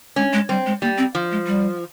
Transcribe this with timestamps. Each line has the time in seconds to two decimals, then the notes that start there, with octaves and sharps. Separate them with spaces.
0.16 G#3 C#4
0.33 G#3
0.49 G3 C4
0.66 G#3
0.82 G3 A#3
0.98 C4
1.15 F3
1.32 G#3
1.47 G3